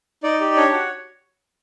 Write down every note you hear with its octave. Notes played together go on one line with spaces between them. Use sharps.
D#4 D5
G4
D4 C#5
F#4